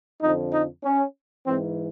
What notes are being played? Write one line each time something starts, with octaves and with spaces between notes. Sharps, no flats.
F2 D3 F3 D#4
D#4
C#4
G#2 E3 C4